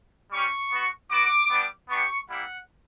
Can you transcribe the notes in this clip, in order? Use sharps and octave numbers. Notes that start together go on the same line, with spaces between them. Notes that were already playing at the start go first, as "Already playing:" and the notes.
G3 C#4 G4 C#6
B3 F#4
B3 F#4 D6
G3 B3 D4
B3 D4 G4 C#6
G3 A#3 E4 F#5